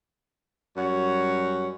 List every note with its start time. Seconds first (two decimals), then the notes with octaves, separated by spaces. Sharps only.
0.77 F#2 G3 F#4 C#5